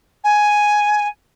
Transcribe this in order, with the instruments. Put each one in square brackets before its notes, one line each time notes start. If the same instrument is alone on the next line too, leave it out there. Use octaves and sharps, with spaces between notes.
[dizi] G#5